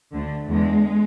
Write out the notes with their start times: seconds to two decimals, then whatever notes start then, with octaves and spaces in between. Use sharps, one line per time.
0.13 D2 D3 A3
0.48 E2 D3 G#3